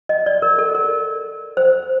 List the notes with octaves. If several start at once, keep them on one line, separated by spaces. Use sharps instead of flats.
D#5
D5
A#4
A4
A#4
C5